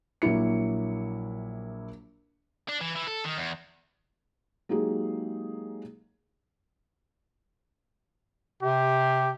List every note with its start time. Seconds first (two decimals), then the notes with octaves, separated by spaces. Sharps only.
0.22 A#1 F#3 A#3 E4 C#7
2.69 D4
2.81 E3
2.96 E3
3.07 A4
3.25 D#3
3.37 E2
4.69 F#3 G#3 A#3 D#4 G4 G#4
8.63 C3 G4